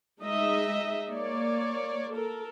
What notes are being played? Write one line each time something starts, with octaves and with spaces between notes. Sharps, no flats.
G#3 D#4 D#5 E5
A#3 C#5 D5
A4 A#4